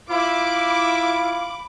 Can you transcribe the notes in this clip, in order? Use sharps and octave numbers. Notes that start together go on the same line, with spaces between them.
E4 F4 B5 D6